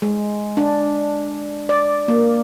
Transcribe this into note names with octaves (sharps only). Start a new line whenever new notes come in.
G#3
D4
D5
A#3